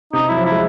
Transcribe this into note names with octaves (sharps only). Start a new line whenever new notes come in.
C3 D#4
F#3 E4
F3
E4
G#3